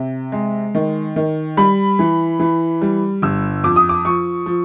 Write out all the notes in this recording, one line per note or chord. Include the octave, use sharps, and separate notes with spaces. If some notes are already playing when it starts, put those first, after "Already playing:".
Already playing: C3
G#3
D#3
D#3
G3 B5
E3
E3
G3
G1 E6
F2 D6
D#6
D6
F3 C#6
F3